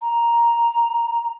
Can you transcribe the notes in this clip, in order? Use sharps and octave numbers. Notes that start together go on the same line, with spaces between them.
A#5